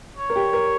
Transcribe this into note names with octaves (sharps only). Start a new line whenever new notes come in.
C#5
A#4
G4
A#4